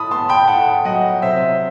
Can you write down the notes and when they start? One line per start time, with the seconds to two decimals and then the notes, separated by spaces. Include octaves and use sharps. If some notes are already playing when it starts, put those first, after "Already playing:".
Already playing: A2 A5 B5 D#6
0.11 B3 A5 C6
0.29 G5 B5
0.47 A2 F#5 A5
0.84 F#3 D#5 F#5
1.22 C3 C5 E5